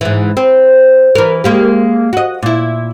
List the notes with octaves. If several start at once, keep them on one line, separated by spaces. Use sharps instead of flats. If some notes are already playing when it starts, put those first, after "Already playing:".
G#2 E3
C4
E3 A#4
G#3 A#3 G4
F#4 D#5
A#2 E4